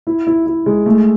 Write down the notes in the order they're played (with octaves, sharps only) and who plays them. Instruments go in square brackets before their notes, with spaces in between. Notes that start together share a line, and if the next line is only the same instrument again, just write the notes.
[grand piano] E4
E4
E4
G#3
A3